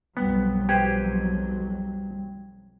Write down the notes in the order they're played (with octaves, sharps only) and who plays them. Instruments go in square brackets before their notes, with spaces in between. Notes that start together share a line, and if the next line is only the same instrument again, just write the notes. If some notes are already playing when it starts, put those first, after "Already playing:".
[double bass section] B1 F2 F#3 [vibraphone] G3 [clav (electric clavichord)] B3
[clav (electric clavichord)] G4 B4 C5 [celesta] G5 G#6